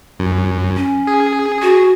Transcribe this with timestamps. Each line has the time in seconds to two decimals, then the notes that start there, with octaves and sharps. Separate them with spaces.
0.19 F#2
0.77 C#4
1.07 G#4
1.62 F#4